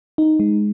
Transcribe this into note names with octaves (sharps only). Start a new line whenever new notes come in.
D#4
G#3